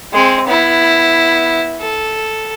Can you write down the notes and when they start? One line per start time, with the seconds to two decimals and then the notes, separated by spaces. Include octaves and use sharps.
0.13 G#3 C4
0.48 B3 E4
1.80 A4